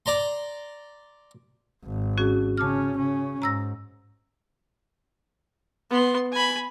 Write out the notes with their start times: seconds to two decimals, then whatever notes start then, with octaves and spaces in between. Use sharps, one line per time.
0.06 D5 A#5 C6
1.84 G#1
2.18 C#4 F#4 G#4
2.57 C#3 C#4 A5 D6 F6
2.98 C#3 C#4
3.42 G#2 A#5 E6 A#6
5.90 B3 C6
6.32 G#5 B5